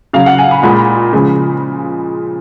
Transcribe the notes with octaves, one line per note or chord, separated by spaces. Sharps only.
C#3 F#3 F5
F#5
G#5
B5
A#2 G#3 B5
C#3 F3 G#3